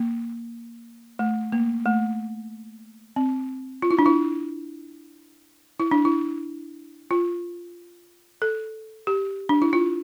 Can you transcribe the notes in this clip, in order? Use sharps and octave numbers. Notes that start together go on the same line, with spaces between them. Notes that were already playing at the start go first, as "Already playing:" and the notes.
Already playing: A#3
A3
A#3
A3
C4
F4
E4
D4
E4
E4
D4
E4
F4
A4
G4
D4
E4
F4